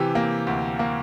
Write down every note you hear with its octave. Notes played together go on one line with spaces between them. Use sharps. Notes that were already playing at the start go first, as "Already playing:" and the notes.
Already playing: C3 E3 G4
A#3
D2
A#3